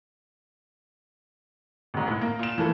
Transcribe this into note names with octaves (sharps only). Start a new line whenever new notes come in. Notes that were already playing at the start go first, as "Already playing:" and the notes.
G#1 G#2
A2
A#3
A#2 E7
E3 F3 A3